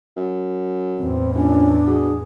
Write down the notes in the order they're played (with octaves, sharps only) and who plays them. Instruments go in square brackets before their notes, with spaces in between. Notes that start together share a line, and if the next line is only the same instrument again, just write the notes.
[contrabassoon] F#2
[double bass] E2 A2 [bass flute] C4
[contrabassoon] A#1 [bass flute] C#4 [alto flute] D4
[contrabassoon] B2 [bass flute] G#4